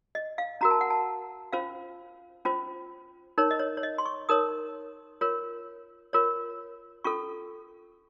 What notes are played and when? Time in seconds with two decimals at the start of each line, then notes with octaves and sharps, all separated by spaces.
0.15 D#5
0.38 F5
0.61 C#4 F#4 A#4 A#5
0.71 A5
0.81 F#5
0.90 A5
1.52 C#4 F4 C5 F5
2.45 C#4 F4 C5
3.38 D#4 A#4 C#5
3.51 D#5
3.59 C#5
3.77 C#5
3.83 D#5
3.98 C6
4.06 C#6
4.29 D#4 A#4 C#5 D#6
5.21 F4 A#4 C#5
6.13 F4 A#4 C#5
7.04 C#4 F4 A4 C#6